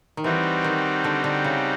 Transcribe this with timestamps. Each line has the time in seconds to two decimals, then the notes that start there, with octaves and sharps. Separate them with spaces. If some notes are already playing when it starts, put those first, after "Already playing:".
0.17 D#3
0.24 E3 G3 C4 D#4 F#4
0.64 D#3
1.04 D3
1.24 D3
1.44 C#3